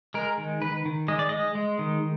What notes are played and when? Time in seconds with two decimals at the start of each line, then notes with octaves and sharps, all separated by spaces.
0.14 G#3 A#4
0.38 D#3
0.62 D#3 B4
0.85 D#3
1.08 G#3 D#5
1.19 D5
1.29 G#3 D#5
1.55 G#3
1.79 D#3